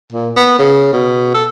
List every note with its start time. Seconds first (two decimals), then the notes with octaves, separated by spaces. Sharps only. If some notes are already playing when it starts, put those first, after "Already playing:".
0.13 A#2
0.36 B3
0.59 C#3
0.93 B2
1.34 A4